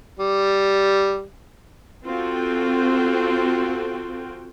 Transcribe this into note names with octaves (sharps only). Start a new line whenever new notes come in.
G3
C4 F4 F#4 A4 G5